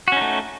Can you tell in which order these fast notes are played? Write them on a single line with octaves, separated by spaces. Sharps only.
F#4 C#4 D#4 A3